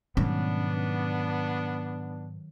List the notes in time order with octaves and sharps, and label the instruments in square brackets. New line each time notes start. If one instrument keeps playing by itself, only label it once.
[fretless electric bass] G#2 B2 G3 [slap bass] D#3 F#3 [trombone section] B3 D4 [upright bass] C#4